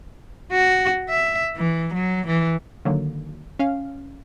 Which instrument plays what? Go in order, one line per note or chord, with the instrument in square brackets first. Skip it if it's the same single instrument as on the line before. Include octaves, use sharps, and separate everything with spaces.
[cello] F#4
E5
E3
F#3
E3
[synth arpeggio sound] D3 D#3 F#3 A#3
C#4 F5